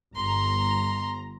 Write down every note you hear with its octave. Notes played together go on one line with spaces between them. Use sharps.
G1 A#5 C6